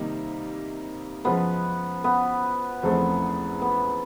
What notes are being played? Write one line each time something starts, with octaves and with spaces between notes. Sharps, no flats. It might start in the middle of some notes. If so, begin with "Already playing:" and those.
Already playing: C3 D#3 G3 A#3 D#4
F#2 C#3 F3 G#3 B3
B3
E2 C#3 F3 A3 C4
B3